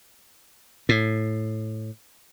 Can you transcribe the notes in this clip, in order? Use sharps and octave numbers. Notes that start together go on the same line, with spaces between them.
A2